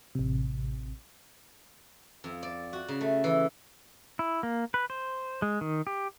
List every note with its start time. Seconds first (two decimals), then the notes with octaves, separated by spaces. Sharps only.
0.15 A1 C3
2.24 F2
2.43 D5
2.73 F#4
2.88 C#3
3.01 A3
3.24 E3
4.19 E4
4.43 A#3
4.74 B4
4.90 C5
5.42 G#3
5.61 D#3
5.87 G4